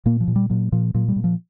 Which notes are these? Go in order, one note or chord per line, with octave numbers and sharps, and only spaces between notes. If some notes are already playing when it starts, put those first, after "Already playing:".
A#2 A#3
F3
A#2
G3
A#2 F#3
A#2 F3
A#2 F#3
G3
A#2
F3